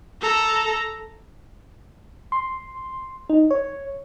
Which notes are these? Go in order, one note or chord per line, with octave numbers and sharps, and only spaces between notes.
A4 A#5
C6
D#4
C#5